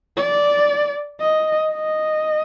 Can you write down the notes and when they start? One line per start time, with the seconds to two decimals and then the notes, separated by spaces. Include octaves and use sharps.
0.17 D5
1.20 D#5
1.72 D#5